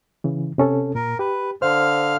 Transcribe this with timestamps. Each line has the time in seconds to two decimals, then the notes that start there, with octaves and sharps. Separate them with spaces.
0.24 C#3 E3
0.58 C3 C#4 A4
0.95 A#2 A#4
1.19 G4 B4
1.62 D3 C5 F5 F6